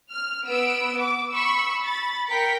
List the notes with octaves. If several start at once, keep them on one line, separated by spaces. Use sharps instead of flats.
F6
B3 E6 D7
D6
B5 C#6 E6
B5 A6
A#4 G5 B6 C#7